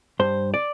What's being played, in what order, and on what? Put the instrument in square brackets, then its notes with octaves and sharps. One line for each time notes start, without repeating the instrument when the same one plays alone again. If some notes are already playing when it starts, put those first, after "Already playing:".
[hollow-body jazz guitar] G2 C5
D5